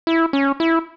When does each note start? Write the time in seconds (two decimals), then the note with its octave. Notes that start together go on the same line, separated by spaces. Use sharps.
0.07 E4
0.33 C#4
0.60 E4